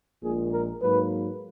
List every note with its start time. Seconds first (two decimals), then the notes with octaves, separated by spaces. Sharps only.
0.22 A#1 A#2 G#3 G#4
0.52 A#4
0.81 G#2 F#3 A#3 B4